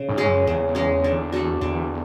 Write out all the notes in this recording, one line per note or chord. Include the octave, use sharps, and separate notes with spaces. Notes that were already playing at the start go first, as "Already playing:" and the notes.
Already playing: C#3
G#2
G#3 C#4 G#4
F#2
E2 C#3
G#3 C#4 G#4
D3
A3 D4 F#4
E2 D3